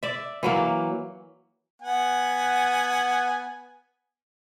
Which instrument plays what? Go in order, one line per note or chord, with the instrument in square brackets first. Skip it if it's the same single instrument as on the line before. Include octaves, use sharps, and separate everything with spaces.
[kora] D5 E5
E3 F#3 A#3
[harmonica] B3 F#5 G#5